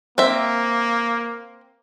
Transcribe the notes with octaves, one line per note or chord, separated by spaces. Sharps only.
A#3 C4 E5